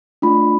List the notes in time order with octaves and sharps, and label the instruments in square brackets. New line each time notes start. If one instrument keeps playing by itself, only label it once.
[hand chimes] A3 D4 F4 B5